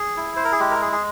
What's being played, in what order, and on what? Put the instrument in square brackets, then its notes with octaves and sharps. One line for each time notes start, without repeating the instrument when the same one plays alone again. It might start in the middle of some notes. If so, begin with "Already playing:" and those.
Already playing: [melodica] G#4
E4
C5
A#4
G#4
G#3 G4
A#4
G#4
G#4